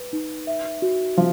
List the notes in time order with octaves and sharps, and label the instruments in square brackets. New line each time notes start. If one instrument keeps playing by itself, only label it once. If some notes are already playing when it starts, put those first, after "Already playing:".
Already playing: [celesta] B4
D#4
E5
F#4
[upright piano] F3